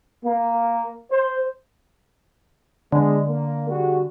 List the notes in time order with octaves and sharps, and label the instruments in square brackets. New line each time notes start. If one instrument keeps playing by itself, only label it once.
[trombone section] A#3
C5
[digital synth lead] D3 [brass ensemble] G#3 B3 D4
[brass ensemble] A#3
G3 F#4 G#4